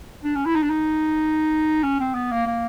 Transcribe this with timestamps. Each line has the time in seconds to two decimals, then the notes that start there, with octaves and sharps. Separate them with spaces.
0.24 D4
0.35 C#4
0.46 E4
0.55 D#4
0.63 D4
0.70 D#4
1.83 C#4
2.00 C4
2.15 B3
2.31 A#3
2.46 A#3